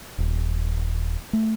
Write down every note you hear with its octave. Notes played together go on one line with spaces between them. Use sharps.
D#1
A3